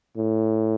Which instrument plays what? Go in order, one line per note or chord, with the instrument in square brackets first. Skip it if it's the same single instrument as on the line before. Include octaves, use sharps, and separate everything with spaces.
[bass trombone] A2